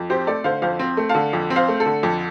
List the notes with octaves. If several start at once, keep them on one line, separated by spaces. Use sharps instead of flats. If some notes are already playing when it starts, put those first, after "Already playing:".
Already playing: F2
C4 G4 C5
A3 A4 D5
D3 C5 F5
F2 C5 F5
C4
A3
F5 A5
D3
F2
C4
C5 F5
A3
A4
D3
F2